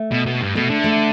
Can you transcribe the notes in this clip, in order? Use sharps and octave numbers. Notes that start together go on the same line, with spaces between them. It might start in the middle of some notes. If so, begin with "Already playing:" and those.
Already playing: A3
B2
B2
G2
B2 A3
D3
A3